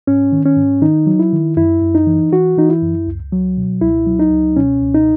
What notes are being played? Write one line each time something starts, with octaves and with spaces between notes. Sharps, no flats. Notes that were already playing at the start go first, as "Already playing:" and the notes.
G#2 C#4
D#3
C#4
G#2
D#3 D#4
F#3
E4
D#3
F#2 E4
F#2
D#4
E3
E3 F#4
E3 D#4
E4
F#2
C#2
F#3
B2
C#2 E4
F#3
D#4
C#2
B2 C#4
C#2
D#4